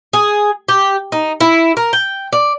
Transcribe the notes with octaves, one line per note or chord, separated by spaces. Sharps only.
G#4
G4
D#4
E4
A#4
G5
D5